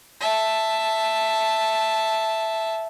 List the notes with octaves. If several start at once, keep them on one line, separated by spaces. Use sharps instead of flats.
E5 A5